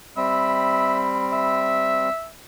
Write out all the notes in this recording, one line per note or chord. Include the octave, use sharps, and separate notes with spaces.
G3 C4 E5 B5
E5